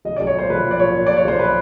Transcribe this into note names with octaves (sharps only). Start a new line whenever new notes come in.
B1 D#5
D5
B1
C#5
A#2 C5
B1 B4
F3
D5
A#2 C#5
A#2
D5
A#2
C#5
B1 C5
B4